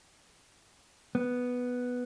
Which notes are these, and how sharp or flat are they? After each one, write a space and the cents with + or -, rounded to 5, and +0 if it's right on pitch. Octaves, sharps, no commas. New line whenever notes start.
B3 +0